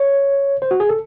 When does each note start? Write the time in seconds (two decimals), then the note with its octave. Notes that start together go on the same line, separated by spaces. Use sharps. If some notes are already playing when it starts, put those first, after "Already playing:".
Already playing: C#5
0.62 C5
0.71 F#4
0.80 G#4
0.89 A4